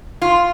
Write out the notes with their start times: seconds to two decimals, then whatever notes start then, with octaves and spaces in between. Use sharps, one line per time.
0.22 F4